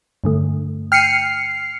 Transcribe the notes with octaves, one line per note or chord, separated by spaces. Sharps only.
G2 D3 A3
G5 F6 C7 C#7 D#7